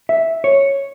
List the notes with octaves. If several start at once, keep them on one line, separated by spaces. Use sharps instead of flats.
E5
C#5